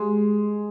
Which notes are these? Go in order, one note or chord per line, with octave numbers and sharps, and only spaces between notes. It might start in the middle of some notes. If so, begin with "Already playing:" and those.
Already playing: G#3